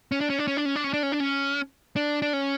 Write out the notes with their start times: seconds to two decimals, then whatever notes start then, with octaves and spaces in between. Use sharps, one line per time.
0.12 C#4
0.21 D4
0.30 C#4
0.39 D4
0.48 C#4
0.57 D4
0.65 C#4
0.76 D4
0.84 C#4
0.93 D4
1.03 C#4
1.12 D4
1.20 C#4
1.96 D4
2.22 D4
2.33 C#4